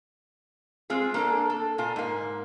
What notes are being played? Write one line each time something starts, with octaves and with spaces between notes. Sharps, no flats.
G#3 C4 F4 G#4
A#3 D4 A4
A4
A#2 F4 G#5
G#2 A#3